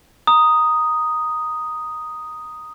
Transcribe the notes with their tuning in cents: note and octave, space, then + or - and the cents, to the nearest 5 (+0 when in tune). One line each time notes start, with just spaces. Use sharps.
A#5 +5 D#6 +0